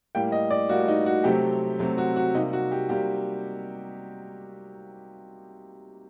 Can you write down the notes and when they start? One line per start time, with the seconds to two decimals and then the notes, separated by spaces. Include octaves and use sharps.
0.15 A2 G3 A#3 G5
0.32 D#5
0.51 D5
0.69 A2 G3 A#3 F#4
0.88 D#4
1.06 F#4
1.24 C3 F#3 A3 C4 G4
1.79 C3 F#3 A3 C4
1.98 F#4
2.16 F#4
2.34 C3 G3 A#3 D#4
2.53 F#4
2.72 G4
2.89 C3 G3 A#3 G4